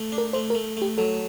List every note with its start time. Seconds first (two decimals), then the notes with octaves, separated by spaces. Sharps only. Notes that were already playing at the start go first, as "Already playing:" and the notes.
Already playing: A3
0.12 D4
0.18 A#4
0.33 A3 C5
0.50 A#4
0.55 A3
0.77 A3 G4
0.98 F#3 A4